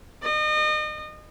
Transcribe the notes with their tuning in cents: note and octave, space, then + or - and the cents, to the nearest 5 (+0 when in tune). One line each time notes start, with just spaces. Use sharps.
D#5 -35